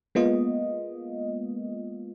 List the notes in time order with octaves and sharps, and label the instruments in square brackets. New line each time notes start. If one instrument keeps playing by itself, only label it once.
[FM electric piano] G#3 A#3 B3 F4 D#5